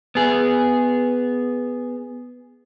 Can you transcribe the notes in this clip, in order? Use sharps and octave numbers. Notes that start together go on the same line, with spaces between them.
B3 G#4